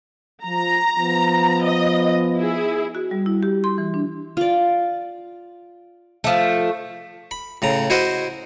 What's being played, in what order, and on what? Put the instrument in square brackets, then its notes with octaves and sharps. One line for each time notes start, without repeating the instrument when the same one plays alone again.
[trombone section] F3 [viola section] A#5
[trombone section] F3 B3
[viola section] D#5
E4 G#4
[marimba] F#4
G3
E4
G4
C6
E3
D4
[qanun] F4 D5
[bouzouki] F3 A3
[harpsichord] B5
A2 C#3 A#5
E4 F#4 C5 D#5 F#5